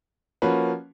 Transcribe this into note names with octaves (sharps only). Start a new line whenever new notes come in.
F3 A#3 C#4 F#4 B4